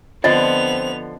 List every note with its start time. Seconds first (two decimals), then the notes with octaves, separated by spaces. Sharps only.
0.24 D3 F3 B3 C4 F4 D#5 F7